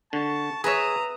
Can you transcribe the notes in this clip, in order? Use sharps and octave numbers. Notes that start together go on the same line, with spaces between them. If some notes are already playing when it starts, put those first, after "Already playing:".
D3 A5 C#6
G#4 B4 C#5 E5 A#5 D#6